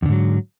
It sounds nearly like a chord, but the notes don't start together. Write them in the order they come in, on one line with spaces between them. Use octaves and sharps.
E2 D3 G#2 F#3